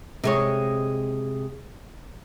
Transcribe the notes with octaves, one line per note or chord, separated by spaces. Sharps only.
C3 G#3 C#5